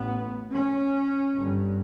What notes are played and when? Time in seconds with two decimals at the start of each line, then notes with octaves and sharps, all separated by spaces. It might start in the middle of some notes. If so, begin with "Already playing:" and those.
Already playing: A1 A2 B3
0.52 C#4
1.35 G1 G2